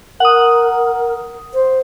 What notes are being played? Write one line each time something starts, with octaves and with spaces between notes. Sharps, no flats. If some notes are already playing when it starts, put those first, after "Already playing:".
A#4 F#5 D#6
C5